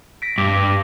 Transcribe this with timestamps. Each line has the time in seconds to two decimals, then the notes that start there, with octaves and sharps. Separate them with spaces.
0.22 A#6 B6 D7
0.38 G2 D6 A#6